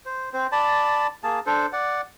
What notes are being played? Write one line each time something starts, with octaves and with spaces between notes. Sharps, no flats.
C5
C4 C5
D5 A5 B5
A#3 G#4 A5
D4 A4 C5
D5 F#5